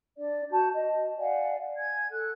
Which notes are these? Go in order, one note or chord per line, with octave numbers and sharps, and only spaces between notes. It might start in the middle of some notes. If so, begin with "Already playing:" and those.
D4 D5
F#4 A5 G6
D#5
D5 F5 F#5 G#5
G#5 G#6
A4 F#6